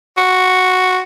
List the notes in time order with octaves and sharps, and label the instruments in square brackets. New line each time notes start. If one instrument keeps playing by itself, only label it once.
[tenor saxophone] F#4